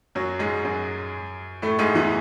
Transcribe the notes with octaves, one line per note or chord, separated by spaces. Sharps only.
F#2 F#3
G#2 G#3
F#2 F#3
A2 A3
G#2 G#3
E2 E3